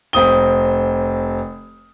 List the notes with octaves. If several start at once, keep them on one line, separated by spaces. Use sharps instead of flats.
F1 C4 D#6 G7